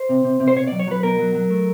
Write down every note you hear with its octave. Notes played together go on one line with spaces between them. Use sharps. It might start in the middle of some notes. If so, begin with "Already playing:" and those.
Already playing: C5
C3
C3
C3
C5
B2 C#5
F#3 D5
C#5
F#3 B4
B2 A#4
F#3
F#3
A3